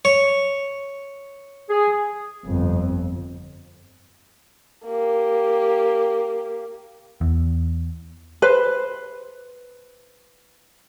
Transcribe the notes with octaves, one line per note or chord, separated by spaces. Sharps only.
C#5
G#4
G1 F2
A#3 G4
E2
B4 C5